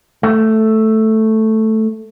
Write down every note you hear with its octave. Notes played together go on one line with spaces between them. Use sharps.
A3